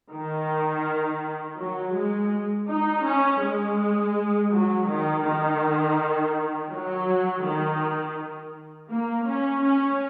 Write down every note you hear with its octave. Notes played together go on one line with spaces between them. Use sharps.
D#3
F#3
G#3
D#4
C#4
G#3
F#3
D#3
D#3
F#3
D#3
A#3
C#4
C#4